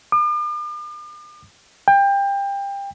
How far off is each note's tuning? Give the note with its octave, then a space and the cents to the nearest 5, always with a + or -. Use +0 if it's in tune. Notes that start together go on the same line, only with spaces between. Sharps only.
D6 +45
G5 +25